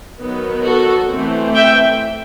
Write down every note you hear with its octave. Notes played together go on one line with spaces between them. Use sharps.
D#3 F#3 B3
F#4 A4
E3 A3 C4
E5 G5